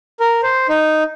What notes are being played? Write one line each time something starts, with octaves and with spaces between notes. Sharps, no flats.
A#4
C5
D#4